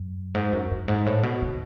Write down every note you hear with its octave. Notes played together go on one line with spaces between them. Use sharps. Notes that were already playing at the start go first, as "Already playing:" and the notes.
Already playing: F#2
G#2
F#2
F#2
G#2
A2
B2
D3